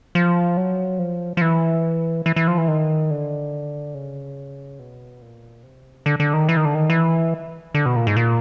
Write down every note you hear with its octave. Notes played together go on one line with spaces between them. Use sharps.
F3
F#3
F3
F3
E3
E3
E3
F3
E3
D#3
D3
C#3
B2
A#2
C3
D3
D3
D#3
E3
D#3
D3
D#3
E3
D3
B2
A#2
G#2
A#2